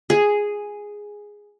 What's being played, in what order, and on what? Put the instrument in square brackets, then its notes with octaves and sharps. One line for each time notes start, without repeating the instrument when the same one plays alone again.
[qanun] G#4